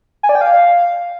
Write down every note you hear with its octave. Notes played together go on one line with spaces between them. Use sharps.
G#5
D5
G5
F5